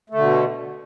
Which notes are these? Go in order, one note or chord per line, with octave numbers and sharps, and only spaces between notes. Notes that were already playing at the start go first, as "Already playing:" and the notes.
B2 D3 A3